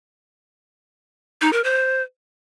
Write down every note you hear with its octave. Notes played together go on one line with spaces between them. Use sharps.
D#4
A#4
C5